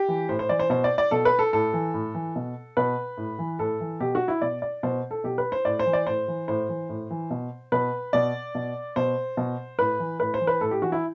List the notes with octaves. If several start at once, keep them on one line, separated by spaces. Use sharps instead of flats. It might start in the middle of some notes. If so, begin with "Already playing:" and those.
Already playing: G4
E3
A2 C5
C5
E3 D5
C5
B2 C5
D5
D5
B2 A4
B4
A4
A2 A4
E3
A2
E3
B2
B2 B4
A2
E3
A2 A4
E3
B2 G4
F#4
E4
B2 D5
D5
B2 C5
A4
B2 G4
B4
C5
A2 D5
C5
E3
D5
A2 C5
E3
A2 C5
E3
A2
E3
B2
B2 B4
B2 D5
B2
B2 C5
B2
A2 B4
E3
A2 B4
C5
E3
B4
A2 A4
G4
E3 F#4
E4